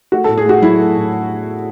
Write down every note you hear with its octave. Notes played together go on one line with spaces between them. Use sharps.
A3 F#4
A2 A4
G#4
A3 F#4
F#3 E4
A3
A2